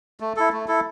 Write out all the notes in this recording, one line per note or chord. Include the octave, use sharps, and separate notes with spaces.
A3
E4 A4
A3
E4 A4